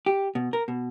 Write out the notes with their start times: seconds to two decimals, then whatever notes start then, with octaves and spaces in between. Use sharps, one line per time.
0.06 G4
0.35 B2
0.53 A#4
0.68 B2